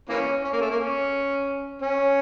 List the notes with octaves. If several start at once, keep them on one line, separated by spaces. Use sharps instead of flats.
E3 A#3 C#4
C#4
A#3
A3
A#3
C#4
C#4